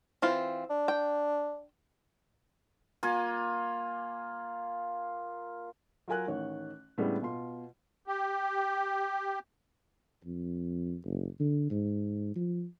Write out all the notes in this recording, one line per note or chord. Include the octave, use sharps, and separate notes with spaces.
E3 C4 F4
D4
G5
A#3 F4 G#5
F#3 F4 A#4 G#5 F#6
A1 D#3 C#5
A2 C#3 G3 G#3 B3 D4
B2 F4 C6
G4
F2
F#1
D3
G#2
F3